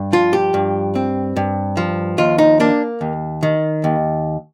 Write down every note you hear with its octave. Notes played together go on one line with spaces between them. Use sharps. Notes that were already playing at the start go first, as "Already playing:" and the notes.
Already playing: G2
F3 F4
G4
G2
C4
G2
F3
D#2 F4
D#4
A#3 D4
D#2
D#3
D#2